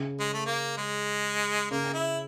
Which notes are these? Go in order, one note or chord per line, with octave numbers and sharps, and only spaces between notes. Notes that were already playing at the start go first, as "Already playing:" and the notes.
Already playing: C#3
G#3
A3
A#3
G#3
C#3 A#3
E4